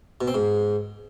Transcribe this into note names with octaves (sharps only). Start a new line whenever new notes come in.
B2
C4
G#2